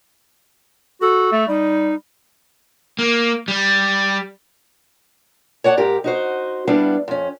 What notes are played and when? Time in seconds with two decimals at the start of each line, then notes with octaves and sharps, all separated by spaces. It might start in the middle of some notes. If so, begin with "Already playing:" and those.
1.01 F#4 A4
1.32 A3
1.48 G3 D#4
2.99 A#3
3.48 G3
5.64 C#5 D5 F#5 A5
5.77 G#2 G4 A#4
6.04 D#4 F#4 C5
6.68 G3 B3 D4 E4 F5
7.08 F2 C#4